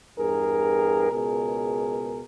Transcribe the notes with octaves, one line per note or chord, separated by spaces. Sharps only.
E2 G2 G#4 A#4
C#2 B2 G#4 A#4